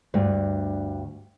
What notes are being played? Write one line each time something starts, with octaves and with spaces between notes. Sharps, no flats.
D2 G2